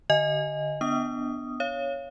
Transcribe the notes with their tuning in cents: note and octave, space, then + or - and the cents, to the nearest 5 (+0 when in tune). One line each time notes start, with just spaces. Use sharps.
D3 +0 D#5 +0 G#5 +0
B3 +0 D4 +0 D#6 +0
C#5 +0 F5 -15